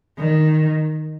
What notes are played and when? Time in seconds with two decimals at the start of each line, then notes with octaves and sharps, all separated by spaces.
0.18 D#3